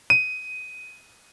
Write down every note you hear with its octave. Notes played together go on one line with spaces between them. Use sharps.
D#7